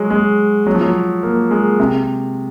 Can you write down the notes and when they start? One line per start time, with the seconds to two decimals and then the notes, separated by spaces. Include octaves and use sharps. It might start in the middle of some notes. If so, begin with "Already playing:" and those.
Already playing: F#3 G#3
0.10 G#3
0.67 F#3
0.75 F3
0.82 F#3
1.23 A#3
1.51 G#3
1.80 C3